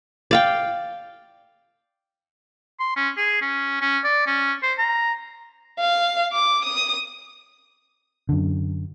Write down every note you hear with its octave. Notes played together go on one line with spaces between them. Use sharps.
D5 F5 G5
C6
C#4
G#4
C#4
C#4
D5
C#4
C5
A#5
F5
D6
D#6
F#2 D3